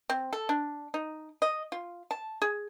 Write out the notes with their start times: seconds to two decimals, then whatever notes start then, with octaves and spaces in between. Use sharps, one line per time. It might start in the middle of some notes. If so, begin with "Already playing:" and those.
0.10 C4
0.33 A4
0.49 D4
0.94 D#4
1.42 D#5
1.72 F4
2.11 A5
2.42 G#4